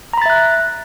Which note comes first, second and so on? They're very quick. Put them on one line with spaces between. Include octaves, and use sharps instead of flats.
A#5 B5 A6 E5 F#6